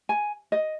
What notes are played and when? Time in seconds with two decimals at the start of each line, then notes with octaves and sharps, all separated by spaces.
0.09 G#5
0.52 D#5